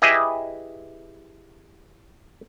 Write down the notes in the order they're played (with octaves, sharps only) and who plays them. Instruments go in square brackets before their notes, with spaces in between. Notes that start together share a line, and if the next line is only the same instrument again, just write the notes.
[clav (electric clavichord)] E4 G4 G#4 B4 D#5 E5